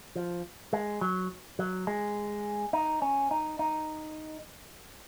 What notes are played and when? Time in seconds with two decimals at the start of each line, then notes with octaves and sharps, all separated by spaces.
0.16 F3
0.73 G#3
1.01 F#3
1.59 F#3
1.87 G#3
2.73 D#4
3.02 C#4
3.31 D#4
3.59 D#4